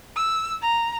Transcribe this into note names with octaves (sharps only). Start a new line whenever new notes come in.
E6
A#5